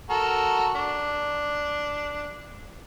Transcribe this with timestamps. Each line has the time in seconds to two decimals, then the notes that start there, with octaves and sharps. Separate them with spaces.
0.10 F#4 A4 A#4
0.75 D4